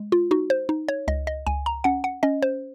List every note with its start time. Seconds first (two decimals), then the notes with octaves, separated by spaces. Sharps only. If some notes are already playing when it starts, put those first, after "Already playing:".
Already playing: G#3
0.12 F4
0.31 D#4 F#4
0.50 C5
0.69 D#4
0.88 C#5
1.08 C#2 D#5
1.27 D#5
1.47 C#2 G#5
1.66 A#5
1.84 C#4 F#5
2.04 F#5
2.23 C#4 D#5
2.42 C5